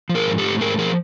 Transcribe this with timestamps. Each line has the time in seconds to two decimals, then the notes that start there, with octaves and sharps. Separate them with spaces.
0.09 F3
0.15 G#4 A#4
0.27 G#2
0.38 G4 A4
0.44 A3
0.61 G#2 G#4 A#4
0.78 F3 G#4 A#4